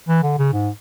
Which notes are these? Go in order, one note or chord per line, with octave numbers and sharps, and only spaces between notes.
E3
D3
C#3
G#2